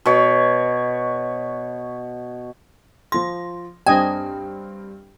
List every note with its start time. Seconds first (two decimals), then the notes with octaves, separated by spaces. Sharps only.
0.05 B2 C#5
3.12 F3 C6 A#6
3.87 G2 C4 D4 D#5 G5 G#5